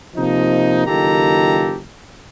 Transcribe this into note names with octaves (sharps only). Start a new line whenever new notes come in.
C3 F3 A#3 D#4
F#1 D#3 F4 G4 A4 A#5